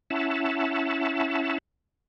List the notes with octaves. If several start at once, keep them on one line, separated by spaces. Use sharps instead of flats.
C#4 E4 E5 F#5 A5